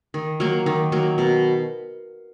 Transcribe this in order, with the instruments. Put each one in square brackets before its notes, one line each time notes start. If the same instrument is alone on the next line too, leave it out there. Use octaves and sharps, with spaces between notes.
[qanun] D#3
F#3 A#3
D#3
F#3 A#3
B2